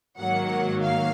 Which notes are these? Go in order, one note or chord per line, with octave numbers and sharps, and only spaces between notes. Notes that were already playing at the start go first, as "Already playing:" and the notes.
G#2 D#3 F#3 A#3 F#5
F5